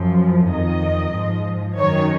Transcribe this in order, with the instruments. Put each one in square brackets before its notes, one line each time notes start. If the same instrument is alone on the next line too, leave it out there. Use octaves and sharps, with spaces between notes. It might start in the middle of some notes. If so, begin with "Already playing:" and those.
Already playing: [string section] F#2 F3
F2 D#3 D#5
G#2 F3
F#2 D#3 C#5